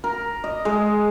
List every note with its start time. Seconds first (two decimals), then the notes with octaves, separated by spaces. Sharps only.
0.04 A#4
0.44 D#5
0.65 G#3